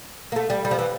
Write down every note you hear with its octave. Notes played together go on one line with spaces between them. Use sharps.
A#3
A3
G3
G3
F3
E3